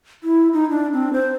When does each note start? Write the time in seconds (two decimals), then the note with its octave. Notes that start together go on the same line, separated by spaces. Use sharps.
0.24 E4
0.53 D#4
0.70 D4
0.93 C4
1.13 C5